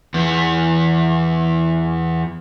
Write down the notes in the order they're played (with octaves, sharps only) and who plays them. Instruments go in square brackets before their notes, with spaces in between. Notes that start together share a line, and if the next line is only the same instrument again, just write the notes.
[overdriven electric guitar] E2 B3